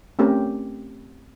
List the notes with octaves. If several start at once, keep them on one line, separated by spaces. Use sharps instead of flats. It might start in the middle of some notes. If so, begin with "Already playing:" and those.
A3 C4 C#4 G4 A#4